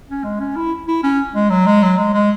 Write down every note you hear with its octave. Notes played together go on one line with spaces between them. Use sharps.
C#4
G#3
C#4
E4
E4
C#4
G#3
F#3
G#3
F#3
G#3
G#3